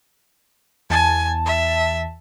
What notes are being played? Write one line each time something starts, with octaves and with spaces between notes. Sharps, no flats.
E2 G#5 A5
E5